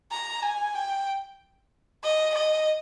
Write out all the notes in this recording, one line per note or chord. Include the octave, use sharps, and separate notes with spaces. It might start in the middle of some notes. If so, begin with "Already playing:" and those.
A#5
G#5
G5
D#5
D#5